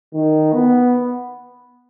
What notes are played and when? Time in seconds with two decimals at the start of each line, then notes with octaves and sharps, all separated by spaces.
0.13 D#3
0.53 B3